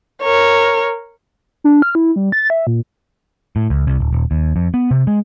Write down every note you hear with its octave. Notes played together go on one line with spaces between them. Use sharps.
A#4 C#5
D4
F6
E4
G3
A6
E5
A#2
A2
C#2
C2
D1
D#1
D#2
F2
B3
C3
G#3